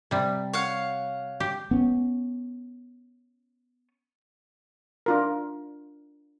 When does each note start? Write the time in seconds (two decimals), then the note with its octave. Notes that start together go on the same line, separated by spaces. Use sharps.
0.11 C3 G3
0.53 C#5 F5 F#5
1.40 G4
1.71 B3 C#4
5.06 D4 F4 A#4